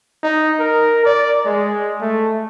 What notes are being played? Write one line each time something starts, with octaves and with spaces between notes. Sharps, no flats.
D#4
A#4
D5
G#3
A3